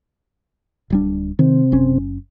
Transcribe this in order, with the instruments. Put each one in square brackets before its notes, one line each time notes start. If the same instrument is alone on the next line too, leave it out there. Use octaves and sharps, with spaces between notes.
[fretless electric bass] D1 G3 D4
[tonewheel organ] C3 C4 [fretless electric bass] D#3
[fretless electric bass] F#1 C#4